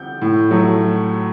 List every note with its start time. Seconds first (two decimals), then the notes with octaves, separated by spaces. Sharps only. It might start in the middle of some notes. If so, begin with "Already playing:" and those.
Already playing: G6
0.21 A2
0.51 F#3 A3